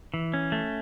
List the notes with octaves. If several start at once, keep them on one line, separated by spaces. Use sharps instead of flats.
E3
C#4
A3